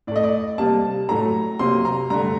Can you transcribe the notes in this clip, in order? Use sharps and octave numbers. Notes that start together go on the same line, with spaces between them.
A2 A3 D5 D#5
D5
C3 G3 A#3 A5
A2 F#3 A3 A#5
C3 F#3 A#3 C6
A#5
G2 D3 A3 A#5